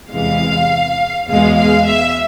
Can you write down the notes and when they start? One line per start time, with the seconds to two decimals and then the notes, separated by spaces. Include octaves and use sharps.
0.11 E2 C3 E3 G#3 F5
1.27 E2 B2 G#3 F5
1.56 F5
1.86 E5